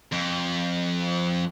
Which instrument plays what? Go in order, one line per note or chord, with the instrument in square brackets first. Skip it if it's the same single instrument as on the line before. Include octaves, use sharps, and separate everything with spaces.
[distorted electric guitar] F2